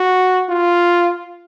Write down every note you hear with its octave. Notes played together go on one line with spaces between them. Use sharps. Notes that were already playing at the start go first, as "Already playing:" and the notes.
Already playing: F#4
F4